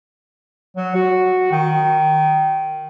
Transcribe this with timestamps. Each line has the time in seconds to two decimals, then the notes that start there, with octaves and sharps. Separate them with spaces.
0.76 F#3
0.95 F#4
1.51 D#3